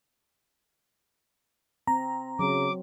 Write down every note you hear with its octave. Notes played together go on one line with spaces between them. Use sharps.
C4 A#5
C#3 F#3 D6